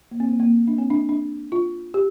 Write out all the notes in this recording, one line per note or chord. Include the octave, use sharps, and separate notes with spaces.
A#3
C4
A#3
A#3
D4
C4
D4
D4
F4
G4